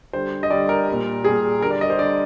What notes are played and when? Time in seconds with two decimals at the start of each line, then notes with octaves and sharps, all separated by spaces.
0.13 D3 G3 C5
0.43 D#5
0.50 D3 G3 D5
0.69 A#4
0.88 A#2 G3
1.24 A#2 G3 G#4
1.62 D3 G3 A#4
1.71 D5
1.81 D#5
1.90 C5
1.99 D3 G3 D5